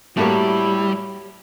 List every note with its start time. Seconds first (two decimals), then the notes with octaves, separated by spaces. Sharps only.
0.17 A2 G3 A#3 E4 F#4 G4 C#5